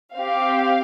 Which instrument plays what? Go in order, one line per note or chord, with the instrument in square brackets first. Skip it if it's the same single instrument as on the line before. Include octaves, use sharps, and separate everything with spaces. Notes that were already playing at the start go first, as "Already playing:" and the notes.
[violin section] C4 G4 F5